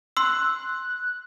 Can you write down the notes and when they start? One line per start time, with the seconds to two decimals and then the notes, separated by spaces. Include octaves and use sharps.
0.17 C6 E6 F#6